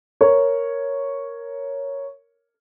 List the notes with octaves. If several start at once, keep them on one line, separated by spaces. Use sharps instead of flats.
A#4 C#5